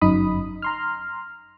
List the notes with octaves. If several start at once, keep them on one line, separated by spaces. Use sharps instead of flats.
G1 F#2 D#4 B5 D#6
A#5 C6 F6